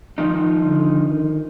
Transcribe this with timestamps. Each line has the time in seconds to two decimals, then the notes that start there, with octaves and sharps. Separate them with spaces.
0.18 D#3 F3 D#4
0.64 D3
1.10 D#3